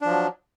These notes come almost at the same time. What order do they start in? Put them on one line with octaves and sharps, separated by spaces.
D4 F3 F#3